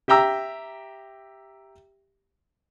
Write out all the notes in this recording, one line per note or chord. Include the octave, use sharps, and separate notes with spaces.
G4 E5 G5 A#5 E6